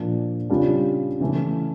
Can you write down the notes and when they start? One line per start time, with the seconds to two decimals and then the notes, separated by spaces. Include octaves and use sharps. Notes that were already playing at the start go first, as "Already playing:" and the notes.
Already playing: A#2 F3 A#3 D4
0.50 C#3 G3 D4 F4
1.20 C#3 E3 A3